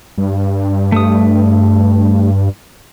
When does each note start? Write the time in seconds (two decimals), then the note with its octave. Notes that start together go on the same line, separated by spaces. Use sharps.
0.18 G2
0.92 A3 D#6